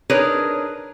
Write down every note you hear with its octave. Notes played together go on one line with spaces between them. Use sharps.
D4 D#4 G#4 A#4 B4 C#5